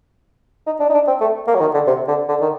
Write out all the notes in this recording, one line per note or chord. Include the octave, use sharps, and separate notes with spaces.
D#4
D4
D#4
D4
C4
A3
A#3
F#3
D#3
D3
C3
D3
D3
D#3